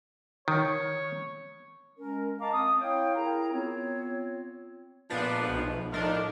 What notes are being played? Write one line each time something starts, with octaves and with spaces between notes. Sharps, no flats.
D#3 C#5
G#3 C#4 A#4
D#5 F5 A5 A#5 D6
C4 D#6
E4 C#5 F5 G5
E4 G#4 A#4 A#5
B3 C4 F4 C#5
A#2 F3 G#3 B3 D4
B1
A2 F3 D4 D#4 A#4